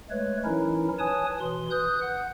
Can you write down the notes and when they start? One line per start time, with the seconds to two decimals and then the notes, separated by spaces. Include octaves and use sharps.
0.10 G#3 A3 B4 C#5
0.44 E3 F#3 C#4 D#4 E4 A#4
0.99 B4 C#5 G#5 A5 D#6
1.40 B2 E3 C6
1.71 B4 D#6 F#6 G6
2.02 F#5